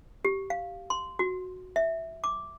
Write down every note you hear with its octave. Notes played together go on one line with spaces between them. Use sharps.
G4
F5
C6
F#4
E5
D6